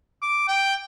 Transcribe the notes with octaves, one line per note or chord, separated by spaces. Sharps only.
D6
G5